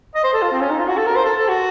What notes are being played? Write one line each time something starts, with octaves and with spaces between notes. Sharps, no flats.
D#5
C5
A4
F4
C4
C#4
D#4
F4
F#4
A4
A#4
C5
A4
A4
F#4